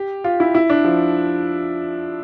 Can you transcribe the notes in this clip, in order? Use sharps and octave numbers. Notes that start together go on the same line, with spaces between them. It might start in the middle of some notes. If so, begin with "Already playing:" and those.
Already playing: G4
F4
E4
E4
D4
F3